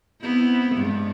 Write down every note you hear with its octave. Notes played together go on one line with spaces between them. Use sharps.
B3 C4 E4
G2 G#3